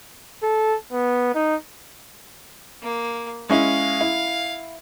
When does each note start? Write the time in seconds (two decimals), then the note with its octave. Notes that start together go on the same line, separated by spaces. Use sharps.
0.43 A4
0.93 B3
1.35 D#4
2.82 A#3
3.50 G#3 C#4 E4 F5
4.01 E4